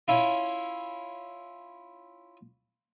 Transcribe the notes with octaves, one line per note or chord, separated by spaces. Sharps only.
C#4 E4 F4